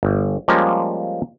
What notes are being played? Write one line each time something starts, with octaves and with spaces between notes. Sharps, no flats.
G1
F3 G3 G#3 A#3 C#4